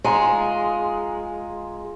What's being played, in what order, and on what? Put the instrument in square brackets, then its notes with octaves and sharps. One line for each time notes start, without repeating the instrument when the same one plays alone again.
[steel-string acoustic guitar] G#3 [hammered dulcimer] F4 A#5 C#6